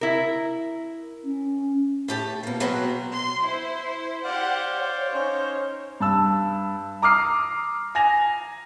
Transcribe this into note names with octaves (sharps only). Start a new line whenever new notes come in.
E4 A#4
C#4
A2 G4 A5
B2 A#3
B2 F#3 C4 F#4 B4
C6
E4 C5
G4 C5 D5 F5 F#5
C#5
C#4 D#4 C5
G2 A5 E6
A#5 D6 D#6 F6 C7
G#5 A#6 F7